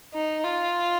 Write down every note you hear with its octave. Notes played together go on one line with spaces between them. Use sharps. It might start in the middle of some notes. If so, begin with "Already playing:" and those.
D#4
F4